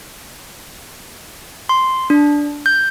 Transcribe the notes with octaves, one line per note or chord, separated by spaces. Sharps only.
C6
D4
G6